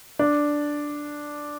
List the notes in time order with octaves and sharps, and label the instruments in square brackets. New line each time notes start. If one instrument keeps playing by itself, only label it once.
[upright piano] D4